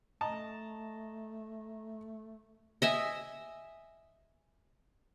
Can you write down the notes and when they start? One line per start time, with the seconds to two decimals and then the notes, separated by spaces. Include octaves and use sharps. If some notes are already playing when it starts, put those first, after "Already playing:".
0.21 A3 D#5 A5 A#5
2.82 D#5 E5 G#5